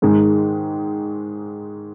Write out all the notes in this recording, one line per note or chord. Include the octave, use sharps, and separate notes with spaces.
G#2 D#3 G#3